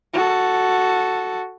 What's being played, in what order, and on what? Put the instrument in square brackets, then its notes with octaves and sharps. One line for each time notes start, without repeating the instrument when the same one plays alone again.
[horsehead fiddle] F#4 A4